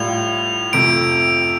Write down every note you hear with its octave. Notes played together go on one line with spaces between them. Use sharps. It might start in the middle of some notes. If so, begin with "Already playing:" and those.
Already playing: A2 G3 F4 F7
F2 C3 A3 D7